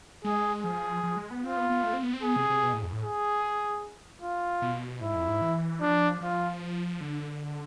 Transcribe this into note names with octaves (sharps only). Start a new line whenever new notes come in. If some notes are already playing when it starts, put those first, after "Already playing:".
G#3 G#4
F3 G#4
F3
G#3
B3
C4 F4
B3
B3
A3
C4
B3
C4
B3 G#4
C3
C3
B2
A2
F2
A2
G#4
F4
B2
G#2 E4
F2
G#2
E3
F3 D4
F3 F4
D3